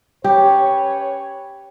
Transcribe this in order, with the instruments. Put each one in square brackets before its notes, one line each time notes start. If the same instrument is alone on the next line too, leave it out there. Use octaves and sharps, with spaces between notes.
[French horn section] C#4 B4 C#5 [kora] G4